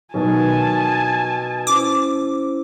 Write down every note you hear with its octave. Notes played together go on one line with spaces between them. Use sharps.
B2 D#3 F#3 G#5 A5
C#4 E4 C5 D6